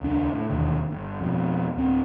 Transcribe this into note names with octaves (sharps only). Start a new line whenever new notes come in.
D#1 C#2 D4
A2
E1 A#1 D#2 D3
G1
F2 B2
D1 C4